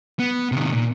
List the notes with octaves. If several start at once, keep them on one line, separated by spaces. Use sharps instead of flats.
B3
C3 D#3
A#2